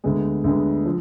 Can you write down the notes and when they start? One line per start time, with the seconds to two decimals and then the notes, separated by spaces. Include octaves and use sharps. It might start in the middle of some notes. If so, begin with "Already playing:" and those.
0.04 D2 D3 G#3 B3
0.44 D2 D3 G#3 B3
0.86 F3